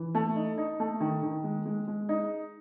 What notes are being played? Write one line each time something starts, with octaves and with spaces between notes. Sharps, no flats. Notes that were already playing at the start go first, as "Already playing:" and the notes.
Already playing: E3
A3
D#4
D#4
A3
D#3
D#3
G#3
G#3
G#3
D#4